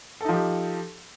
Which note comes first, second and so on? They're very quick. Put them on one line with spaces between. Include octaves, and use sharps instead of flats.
A4 D#4 F3 G4